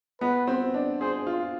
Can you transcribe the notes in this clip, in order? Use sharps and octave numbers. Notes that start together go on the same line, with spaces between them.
B3 B4
C4
D4
G#4 C5
F4